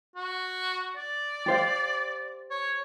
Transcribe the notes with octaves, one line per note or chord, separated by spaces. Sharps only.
F#4
D5
G4 C5 F5
C#5